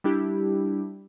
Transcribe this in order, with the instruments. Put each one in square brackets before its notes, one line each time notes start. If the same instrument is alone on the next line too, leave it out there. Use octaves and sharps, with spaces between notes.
[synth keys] G3 D4 E4 G4